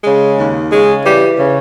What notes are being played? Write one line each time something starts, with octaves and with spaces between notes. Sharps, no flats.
C#3 G#3
D#2
C#3 G#3
E3 G3
C#3